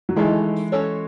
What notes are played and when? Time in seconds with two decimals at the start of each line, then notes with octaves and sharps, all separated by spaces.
0.09 F#3
0.16 D#3 E3 G#3 A3 D#4
0.72 C#4 F#4 A4 C#5